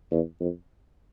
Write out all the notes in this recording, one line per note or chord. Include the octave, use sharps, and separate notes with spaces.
E2
F2